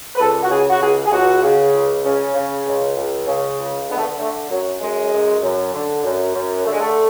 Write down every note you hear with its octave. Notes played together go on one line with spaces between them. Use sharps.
B4
C#2 A4
F#4
C#3 G#4
F#4
C#2 G#4
G#4
C#2 F#4
C#3
C#2
C#3 C#4
C#3
C#2
C#2
C#3
C#2
D3 B3
A3
B3
D3 A3
F#2 F#3
F#2 G#3
F#2
F#2
D3
F#2
F#2
D3 A3
G#3
A3